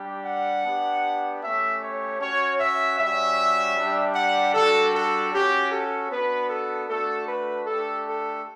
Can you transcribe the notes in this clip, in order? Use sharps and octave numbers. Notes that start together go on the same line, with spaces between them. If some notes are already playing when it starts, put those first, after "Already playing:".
Already playing: G3 D4 G4
F#5
B3 D4 G4
A3 C#4 G4 E5
C#5
C#4 F#4 C#5
E5
G3 C#4 F#4 E5
G3 D4 G4
F#5
G3 D4 F#4 A4
A4
C#4 F#4 G4
A4
B3 D4 F#4 B4
A4
A3 D4 F#4 A4
B4
A3 D4 G4 A4
A4